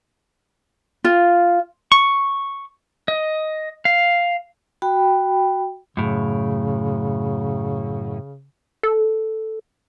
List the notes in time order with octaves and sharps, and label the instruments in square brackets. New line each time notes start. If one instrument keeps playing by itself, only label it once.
[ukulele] F4
[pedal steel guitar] C#6
D#5
F5
[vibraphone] F#4 G5 B5
[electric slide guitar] F#2 A2 [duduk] C#3
[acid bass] A4